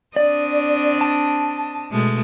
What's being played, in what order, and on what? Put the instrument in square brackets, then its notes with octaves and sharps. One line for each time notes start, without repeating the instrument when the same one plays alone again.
[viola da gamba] C4 D4 D#5 [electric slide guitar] D5
[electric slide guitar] A5
[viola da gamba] B2 G#3 A3